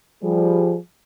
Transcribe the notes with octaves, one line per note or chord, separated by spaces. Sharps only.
F3 G3 G#4